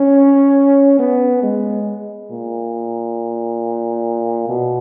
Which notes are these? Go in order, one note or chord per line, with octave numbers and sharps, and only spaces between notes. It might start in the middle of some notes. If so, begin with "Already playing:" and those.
Already playing: C#4
B3
G#3
A#2
B2